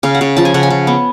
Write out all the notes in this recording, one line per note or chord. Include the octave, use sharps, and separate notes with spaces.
C#3 F5
F#5
C#3
F3 A5
G#5
C#3 F#5
G#5
C#3
B3